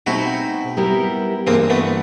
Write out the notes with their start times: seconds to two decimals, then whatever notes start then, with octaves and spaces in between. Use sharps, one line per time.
0.07 B2 G#3 C4 D#4 E4 F#4
0.77 G3 B3 E4 G4 A#4
1.46 G2 E3 G#3 A#3 C4
1.70 A3 B3